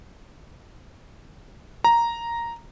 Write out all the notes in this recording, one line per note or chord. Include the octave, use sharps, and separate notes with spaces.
A#5